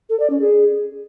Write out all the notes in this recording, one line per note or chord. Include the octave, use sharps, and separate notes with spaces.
A4
D5
C#4
G#4